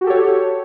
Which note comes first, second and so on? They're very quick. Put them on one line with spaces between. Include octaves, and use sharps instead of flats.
F#4 G4 A4 C#5